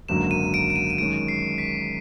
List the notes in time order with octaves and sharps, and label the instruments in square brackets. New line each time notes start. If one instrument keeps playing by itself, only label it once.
[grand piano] G#1 F#2 D3 F#3 A#3 [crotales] E7
[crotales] D#7
D7
D7
D#7
D#7
[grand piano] F#2 D#3 G#3 C#4 [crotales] D7
[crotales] C7
B6